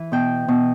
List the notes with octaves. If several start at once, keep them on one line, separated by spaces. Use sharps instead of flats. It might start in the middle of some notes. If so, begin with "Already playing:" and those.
Already playing: E3
B2 G5
B2